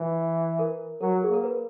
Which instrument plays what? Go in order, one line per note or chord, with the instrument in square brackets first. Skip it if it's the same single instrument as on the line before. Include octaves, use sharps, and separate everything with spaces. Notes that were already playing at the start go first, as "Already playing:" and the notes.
Already playing: [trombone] E3
[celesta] A#4
[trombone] F#3 [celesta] A#4
[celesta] G#4
[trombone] A#3 [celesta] A#4
[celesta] B4